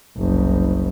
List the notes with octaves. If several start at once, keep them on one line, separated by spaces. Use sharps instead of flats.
F#1 C2